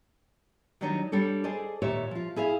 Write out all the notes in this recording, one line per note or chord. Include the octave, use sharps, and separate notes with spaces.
D#3 F#3 G3 D4 D#4 C#5
G3 D4 A4 C#5
G#4 A4 C5 D5 D#5
D#2 A#2 G4 C#5 E5
F3 F4
E4 G#4 E5 F5